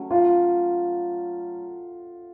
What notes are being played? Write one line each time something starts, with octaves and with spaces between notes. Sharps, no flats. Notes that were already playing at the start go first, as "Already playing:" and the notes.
Already playing: F#3 A3 C#4
F4